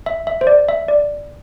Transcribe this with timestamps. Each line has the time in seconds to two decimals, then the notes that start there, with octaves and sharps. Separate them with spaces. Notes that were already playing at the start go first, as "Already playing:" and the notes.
0.06 E5
0.27 E5
0.41 C5
0.47 D5
0.69 E5
0.88 D5